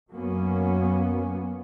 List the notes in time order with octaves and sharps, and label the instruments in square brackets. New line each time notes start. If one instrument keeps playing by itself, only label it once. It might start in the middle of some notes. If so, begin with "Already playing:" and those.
[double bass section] F#2 F#3 A#3 B3 C#4